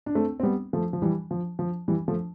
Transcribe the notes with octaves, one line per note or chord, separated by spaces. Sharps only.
D4
A3 C4
C4
G3 B3
F3 A3
F3
E3 G3
F3
F3
E3 G3
F3 A3